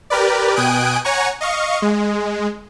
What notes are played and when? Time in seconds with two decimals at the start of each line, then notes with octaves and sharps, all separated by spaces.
0.10 G4 A#4 B4 D5
0.56 B2 G5 G#5 D#6 F#6 D7
1.05 C#5 F#5 G#5 A#5 C#6
1.41 D#5 F5 C#6
1.82 G#3